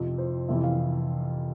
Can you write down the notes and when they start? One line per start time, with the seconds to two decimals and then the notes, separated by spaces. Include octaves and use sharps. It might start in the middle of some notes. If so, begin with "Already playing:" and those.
Already playing: F2 C3 F3
0.18 C5
0.48 F2 C3 E3 E5
0.63 F5